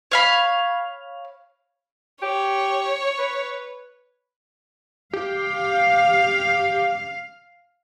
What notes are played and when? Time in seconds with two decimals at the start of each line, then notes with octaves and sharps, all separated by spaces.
0.12 C#5 F5 B5
2.22 G4 C#5
3.19 B4
5.13 G4 F5